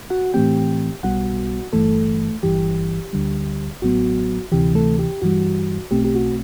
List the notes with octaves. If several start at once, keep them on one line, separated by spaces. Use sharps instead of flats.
F#4 F#5
A2 E3 A3 C4 G4 G5
B1 B2 G3 B3 F#4 F#5
G1 G2 E3 A3 A4
G1 G2 E3 G4
D2 D3 G3
A1 A2 F#3 B3 F#4
D2 C3 E3 G4
A3 A4
G4
G2 E3 G3 F#4
B1 B2 A3 C4 G4
G4
F#4